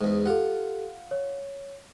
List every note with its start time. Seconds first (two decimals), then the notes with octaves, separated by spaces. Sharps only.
0.01 E2 G#2
0.26 F4 G4 A4 F#5
1.11 C#5